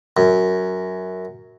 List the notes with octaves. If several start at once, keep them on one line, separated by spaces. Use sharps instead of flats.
F#2